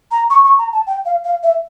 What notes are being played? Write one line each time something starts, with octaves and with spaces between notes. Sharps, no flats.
A#5
C#6
C#6
A#5
A5
G5
F5
F5
E5